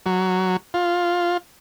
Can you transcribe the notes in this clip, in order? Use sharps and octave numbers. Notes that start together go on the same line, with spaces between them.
F#3
F4